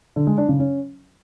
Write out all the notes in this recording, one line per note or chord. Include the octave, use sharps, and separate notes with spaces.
D3
G#3
D4
C#3
C#4